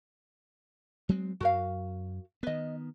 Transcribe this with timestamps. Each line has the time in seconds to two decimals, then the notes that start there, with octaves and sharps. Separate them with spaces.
1.09 F#3 G#3 C4
1.40 F#2 F#4 A#4 F5
2.43 D#3 B3 B4 D#5